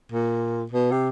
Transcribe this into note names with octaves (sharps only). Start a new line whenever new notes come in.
A#2
B2
C3